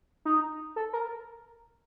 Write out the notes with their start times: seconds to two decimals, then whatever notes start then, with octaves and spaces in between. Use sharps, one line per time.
0.25 D#4
0.76 A4
0.93 A#4